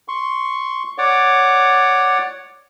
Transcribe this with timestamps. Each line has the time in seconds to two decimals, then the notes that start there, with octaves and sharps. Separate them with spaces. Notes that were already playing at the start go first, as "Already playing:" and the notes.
0.08 C6 C#6
0.98 C#5 D5 F#5 D6